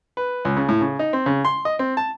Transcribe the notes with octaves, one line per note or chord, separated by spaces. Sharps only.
B4
C#2
C#3
A2
C#3
D#4
C4
C#3
C6
D#5
C4
A5